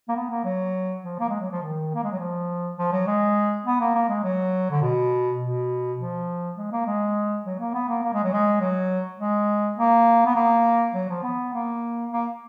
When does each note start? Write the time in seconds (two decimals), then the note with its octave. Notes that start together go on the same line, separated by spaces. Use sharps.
0.09 A#3
0.16 B3
0.30 A#3
0.45 F#3
1.03 F3
1.20 A#3
1.30 G#3
1.40 F#3
1.52 F3
1.62 D#3
1.95 A#3
2.03 G#3
2.12 F#3
2.19 F3
2.78 F3
2.92 F#3
3.07 G#3
3.66 B3
3.81 A#3
3.95 A#3
4.09 G#3
4.24 F#3
4.71 D3
4.82 B2
5.41 B2
5.99 F3
6.57 G#3
6.72 A#3
6.87 G#3
7.45 F#3
7.60 A#3
7.74 B3
7.88 A#3
8.04 A#3
8.13 G#3
8.24 F#3
8.33 G#3
8.61 F#3
9.20 G#3
9.78 A#3
10.26 B3
10.36 A#3
10.94 F#3
11.10 F3
11.23 B3
11.54 A#3
12.11 A#3